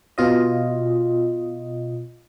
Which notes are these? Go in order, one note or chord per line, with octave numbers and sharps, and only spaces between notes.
B2 F4 D#5